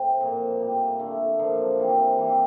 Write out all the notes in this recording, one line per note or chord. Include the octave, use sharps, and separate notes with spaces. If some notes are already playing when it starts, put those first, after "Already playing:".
Already playing: A2 C4
A#2 F3 A#3
A2 G3 A#3
D3 A3 D4
A#2 F3 A#3
C3 E3 A#3
E3 G3 A#3